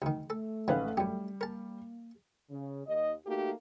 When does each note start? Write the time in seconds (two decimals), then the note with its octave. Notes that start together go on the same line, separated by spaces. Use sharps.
0.02 D2 D#3
0.30 A3 A4
0.68 A1 D#3 F3 G#3 B4 F5
0.97 F#2 G3 G4
1.41 A#3 A#4 A5
2.50 C#3
2.86 D#2 D#5
3.26 A3 A#3 D#4 F#4 G4